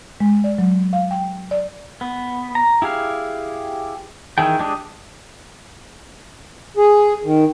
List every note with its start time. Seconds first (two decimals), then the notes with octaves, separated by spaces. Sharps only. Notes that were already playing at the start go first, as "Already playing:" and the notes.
0.20 G#3
0.44 D5
0.58 F#3
0.93 F5
1.11 G5
1.51 D5
2.01 B3
2.55 A#5
2.82 E4 G4 G#4 F5
4.38 D#3 E3 G#4 G5
4.59 G#3 D4 G4 G#4
6.77 G#4
7.24 D#3